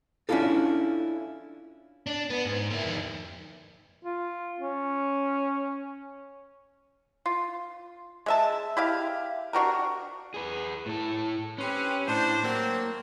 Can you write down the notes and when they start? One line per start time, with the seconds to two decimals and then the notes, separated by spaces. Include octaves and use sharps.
0.29 C#4 D4 E4 F4 A4
2.07 D4
2.30 B3
2.45 G#2
2.71 A#3 E4
2.84 F2 D#3
4.05 F4
4.60 C#4
7.26 F4
8.26 G#3 E5 A5
8.77 E4 G4 F5
9.53 D4 F#4 G4 A#4
10.34 G#4 B4
10.86 A2 A4
11.58 C4 C#4 G4 B4
12.07 A2 D4 C5
12.44 F#3 A#3 C4